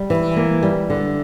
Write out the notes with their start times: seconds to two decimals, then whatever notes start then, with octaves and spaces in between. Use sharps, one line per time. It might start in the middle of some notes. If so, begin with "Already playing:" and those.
Already playing: G3
0.10 E3
0.36 A#3
0.63 G3
0.90 D3